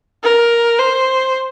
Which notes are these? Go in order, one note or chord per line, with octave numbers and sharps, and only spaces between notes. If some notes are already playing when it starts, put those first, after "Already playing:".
A#4
C5